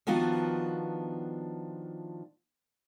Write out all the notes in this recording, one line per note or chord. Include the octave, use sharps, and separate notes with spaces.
D#3 F3 B3 D4 F4 F#4